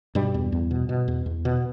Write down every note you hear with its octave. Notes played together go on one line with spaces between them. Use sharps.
G2 B2 G3
E2
E2
B2
B2
E2
E2
B2